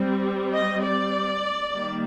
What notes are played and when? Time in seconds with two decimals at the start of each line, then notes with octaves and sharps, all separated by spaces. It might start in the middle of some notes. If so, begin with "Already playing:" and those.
Already playing: G3 C4
0.54 D#5
0.83 D5
1.73 D#3 G3 A#3